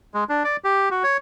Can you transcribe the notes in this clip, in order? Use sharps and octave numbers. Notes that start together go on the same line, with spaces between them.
G#3
D4
D5
G4
F#4
C#5